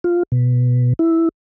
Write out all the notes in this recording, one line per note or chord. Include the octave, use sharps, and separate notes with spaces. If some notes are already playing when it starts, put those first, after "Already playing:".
F4
B2
E4